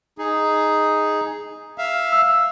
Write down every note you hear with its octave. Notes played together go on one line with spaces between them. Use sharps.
D#4 G#4
E5 F5
E6